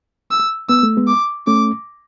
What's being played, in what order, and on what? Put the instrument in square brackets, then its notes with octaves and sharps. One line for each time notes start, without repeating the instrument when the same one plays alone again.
[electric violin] E6
[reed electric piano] B3 [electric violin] E6
[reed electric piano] A3
G#3 B3
[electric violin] D6
[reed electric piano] A3 C#4 [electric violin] D6